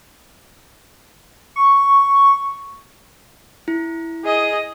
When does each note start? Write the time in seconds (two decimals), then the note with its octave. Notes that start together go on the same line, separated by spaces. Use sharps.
1.56 C#6
3.68 E4
4.25 G#4 D#5